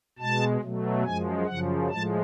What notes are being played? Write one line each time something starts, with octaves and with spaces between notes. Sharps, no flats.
B2 G#3 A5
B2 F#3 A3
F#2 F3 G#3 G#5
F#2 C#3 F3 F#5
A2 F3 G#3 A5